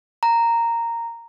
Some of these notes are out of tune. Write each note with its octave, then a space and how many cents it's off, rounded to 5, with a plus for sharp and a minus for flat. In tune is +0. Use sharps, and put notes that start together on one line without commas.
A#5 -10